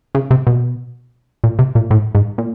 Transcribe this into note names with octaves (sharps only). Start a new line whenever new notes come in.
C#3
C3
B2
A#2
C3
A#2
A2
G#2
A#2